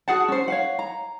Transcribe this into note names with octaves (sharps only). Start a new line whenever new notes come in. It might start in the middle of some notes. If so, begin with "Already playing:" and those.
F#4 G#4 F#5 A5
C#4 C5
C#5 F5 F#5
A#5